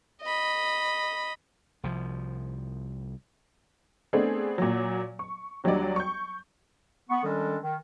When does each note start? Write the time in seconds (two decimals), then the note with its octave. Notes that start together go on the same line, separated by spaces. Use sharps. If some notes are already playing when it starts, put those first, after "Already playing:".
0.22 D#5 B5
1.83 C2 F3
4.13 A3 B3 C4 D4 G#4
4.58 A#2 F#3
5.19 C#6
5.64 D#2 F#3 G3 D4 D5
5.96 C#6 G6
7.10 B3 C#6
7.24 D#3 G3 G#3 C#4 D4 A4
7.63 D#3